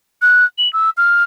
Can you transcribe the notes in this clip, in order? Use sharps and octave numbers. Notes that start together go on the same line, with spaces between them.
F#6
F#7
E6
F6